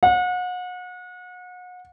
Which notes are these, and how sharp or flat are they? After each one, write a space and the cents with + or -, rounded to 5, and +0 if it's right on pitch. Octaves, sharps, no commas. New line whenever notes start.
F#5 -35